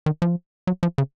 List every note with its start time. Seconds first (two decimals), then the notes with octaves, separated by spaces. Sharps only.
0.06 D#3
0.22 F3
0.67 F#3
0.83 F3
0.98 C#3